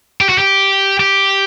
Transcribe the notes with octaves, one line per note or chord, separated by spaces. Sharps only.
G4
F#4
G4
G4